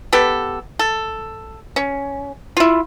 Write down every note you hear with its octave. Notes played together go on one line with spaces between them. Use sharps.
B3 G4 A4
A4
C#4
E4 F4